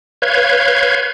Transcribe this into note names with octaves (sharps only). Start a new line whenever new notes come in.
B4 C#5 F5 G6 G#6